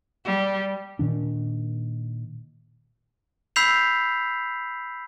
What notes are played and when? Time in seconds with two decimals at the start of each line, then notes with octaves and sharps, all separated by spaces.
0.25 G3
0.99 A#2 D#3 D4
3.56 B5 E6 G6 B6 C7 F7